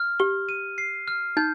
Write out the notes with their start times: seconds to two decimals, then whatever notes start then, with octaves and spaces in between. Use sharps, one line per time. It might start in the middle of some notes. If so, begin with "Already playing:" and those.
Already playing: F6
0.20 G4 G7
0.49 D#7
0.78 C7
1.08 F6
1.37 D#4 G6